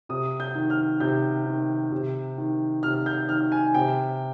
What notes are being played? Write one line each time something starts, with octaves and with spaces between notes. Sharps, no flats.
C3 D#6
G6
D#3
F6
C3 G6
D#3
C3
D#3
C3 F6
G6
D#3 F6
G#5
C3 G5